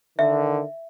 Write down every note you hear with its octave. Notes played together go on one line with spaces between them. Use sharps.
D3 D#3 E5